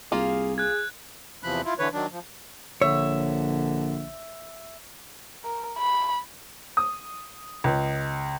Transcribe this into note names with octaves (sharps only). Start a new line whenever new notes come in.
C2 A#3 F4 G#4
G#4 F#6 G#6
E2 C3 E3 F3 B5 F#6
E4 F4
D3 E3 B4 C#5
D#3 F#3 D4
F3
A#1 D3 C#5 E5
A#4
B5
D#6
C#2